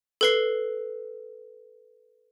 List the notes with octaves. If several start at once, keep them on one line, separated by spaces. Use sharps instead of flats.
A4 B4 C7